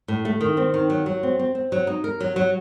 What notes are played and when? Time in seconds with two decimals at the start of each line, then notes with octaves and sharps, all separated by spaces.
0.08 A2
0.25 A3
0.41 D#3
0.57 C4
0.74 D#3
0.90 F#3
1.06 F#3
1.23 C4
1.39 C4
1.55 C4
1.72 F#3
1.87 D#4
2.04 A#4
2.20 F#3
2.36 F#3